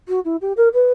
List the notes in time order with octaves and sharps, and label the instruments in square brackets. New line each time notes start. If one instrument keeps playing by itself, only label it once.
[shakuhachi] F#4
E4
G4
A#4
B4